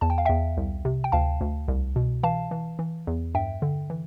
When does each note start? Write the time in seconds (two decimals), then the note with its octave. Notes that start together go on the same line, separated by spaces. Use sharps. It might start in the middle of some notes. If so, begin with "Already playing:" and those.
0.01 E2 A5
0.10 G5
0.18 F5
0.25 E2 E5 G5
0.57 C2
0.85 C3
1.04 G5
1.12 D2 F5 A5
1.41 D2
1.68 C2
1.96 B2
2.23 E3 F5 A5
2.51 E3
2.79 E3
3.07 E2
3.35 G2 E5 G5
3.62 D3
3.90 E3